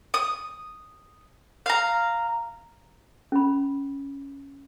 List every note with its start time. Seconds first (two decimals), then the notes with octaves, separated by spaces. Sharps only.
0.14 D#6
1.66 F5 A#5
3.32 C#4 B5